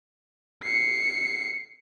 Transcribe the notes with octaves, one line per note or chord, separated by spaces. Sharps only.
C7 C#7